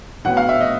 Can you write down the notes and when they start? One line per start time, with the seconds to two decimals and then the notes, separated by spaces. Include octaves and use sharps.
0.24 A2 F#3 B3 F#5
0.37 F5
0.49 E5
0.61 D#5